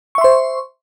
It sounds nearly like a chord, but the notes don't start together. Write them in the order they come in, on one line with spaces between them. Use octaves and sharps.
C#6 E5 C6 C5